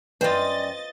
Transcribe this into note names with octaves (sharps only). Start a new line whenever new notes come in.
F#2 F4 B4 C5 D5 D#5 G5 A6